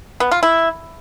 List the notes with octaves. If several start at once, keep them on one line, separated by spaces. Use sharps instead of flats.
B3
F4
E4